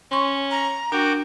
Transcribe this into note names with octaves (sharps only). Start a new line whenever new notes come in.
C#4 C6 C#6
A#5
D4 F#4 A#4 G5 D6